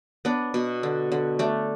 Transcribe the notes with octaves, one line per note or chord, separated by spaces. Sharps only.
B3 D4
B2
D3
D3
A3 D4